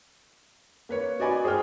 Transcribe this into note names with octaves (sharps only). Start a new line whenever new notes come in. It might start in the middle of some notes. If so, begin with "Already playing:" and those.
A#3 B4 C#5
F#4 D5 D#5 G#5 B5 D6
G#4 C5 D#5 G5 F6